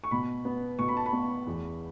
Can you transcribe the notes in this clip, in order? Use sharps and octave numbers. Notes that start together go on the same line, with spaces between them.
C#6
B2 B5
B3
B2 C#6
B5
A5
B5
B3
E2